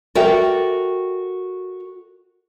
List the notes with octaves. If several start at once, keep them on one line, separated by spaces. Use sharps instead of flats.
F#4 A4 A#4 D5 E5 G5